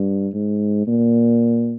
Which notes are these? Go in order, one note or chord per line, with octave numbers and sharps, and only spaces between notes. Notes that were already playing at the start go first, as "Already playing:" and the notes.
Already playing: G2
G#2
A#2